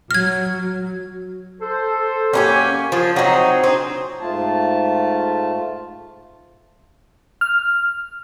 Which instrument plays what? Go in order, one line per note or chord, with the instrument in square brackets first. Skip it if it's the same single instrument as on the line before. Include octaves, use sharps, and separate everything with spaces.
[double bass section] F#3 [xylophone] F6 G#6
[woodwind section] A4 C5
[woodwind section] F#2 A#3 G#5 [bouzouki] C#4 D#4 G4
[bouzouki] F3 [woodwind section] F4 G#4
[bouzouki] F#3 D#4 [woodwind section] C4 F#4 G#4
[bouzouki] C4 [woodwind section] D4 D#4 G#4
[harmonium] G#2 A3 F4 A5
[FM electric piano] F6